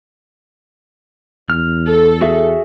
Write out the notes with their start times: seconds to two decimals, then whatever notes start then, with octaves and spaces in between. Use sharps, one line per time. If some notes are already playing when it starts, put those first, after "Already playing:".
1.50 E2 F6
1.88 A4
2.21 F#4 G#4 E5